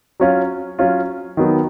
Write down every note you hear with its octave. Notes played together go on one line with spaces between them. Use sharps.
F#3 C#4 F4
F#3 C#4 F4
D#3 F#3 B3